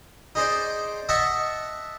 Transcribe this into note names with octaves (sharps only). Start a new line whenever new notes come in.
D#4 G#4 C5 D5
D#5 E5 F#5 A5 C#6